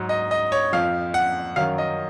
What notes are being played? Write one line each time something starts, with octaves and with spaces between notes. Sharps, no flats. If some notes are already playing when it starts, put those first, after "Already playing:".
Already playing: G#2 F#3
D#5
D#5
C#5
F2 F3 F5
F#5
F#2 D#3 F#3 F5
D#5